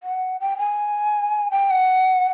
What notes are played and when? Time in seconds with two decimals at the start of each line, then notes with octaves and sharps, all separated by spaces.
0.03 F#5
0.40 G5
0.58 G#5
1.51 G5
1.70 F#5